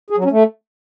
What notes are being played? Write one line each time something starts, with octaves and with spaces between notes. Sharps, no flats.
G#4
F#3
C#4
A3